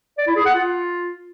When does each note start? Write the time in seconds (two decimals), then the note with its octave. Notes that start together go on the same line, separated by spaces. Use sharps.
0.18 D5
0.27 E4
0.36 G#4
0.45 F#5
0.55 F4